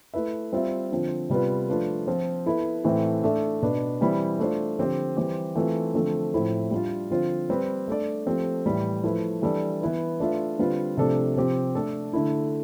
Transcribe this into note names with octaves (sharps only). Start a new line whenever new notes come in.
A3 E4 B4 E5
G3 C4 F4 C5 E5
D3 F3 C4 F4
C3 G3 B3 F4 B4
F3 A3 D4 F4 B4
F3 C4 F4
B3 E4 A4
A2 E3 A3 C4 E4
A3 D4 A4 E5
B2 B3 D4
E3 G3 C4 E4
A3 D4 F4 C5
D3 F3 C4 G4 C5
E3 G3 C4 G4
E3 A3 C4 F4
D3 F3 A3 C4
A2 F3 C4 E4 A4
G3 D4 F4
D3 F3 C4 F4 C5
G3 C4 G4 B4
A3 D4 A4 D5
F3 A3 C4 G4
A2 E3 G3
F3 A3 E4 B4
E3 G3 D4 A4 D5
E3 B3 E4 B4
A3 D4 F4 B4 E5
D3 G3 C4 F4 B4
C3 F3 A3 D4 A4
C3 F3 C4 G4
A3 D4 A4 D5
D3 A3 E4